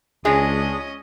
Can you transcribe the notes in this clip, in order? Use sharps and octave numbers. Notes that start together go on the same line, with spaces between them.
C#2 G#3 C#4 D4 G#4 D#5